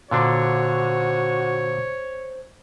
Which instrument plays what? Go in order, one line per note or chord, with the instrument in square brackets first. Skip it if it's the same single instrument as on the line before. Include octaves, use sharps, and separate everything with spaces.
[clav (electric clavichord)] A#2 D3 D4 [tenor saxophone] F#4 [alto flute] C5 [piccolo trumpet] C#5